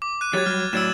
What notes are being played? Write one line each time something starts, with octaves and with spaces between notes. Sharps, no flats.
D6
F#6 D#7
F#3 G4 C#5 G#6 A6
F#3 G3 F6
A2 F#3 D5 E6 G#6 E7